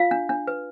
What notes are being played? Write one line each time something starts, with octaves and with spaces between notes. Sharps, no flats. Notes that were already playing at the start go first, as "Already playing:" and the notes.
Already playing: F4 F5
D4
D4
B4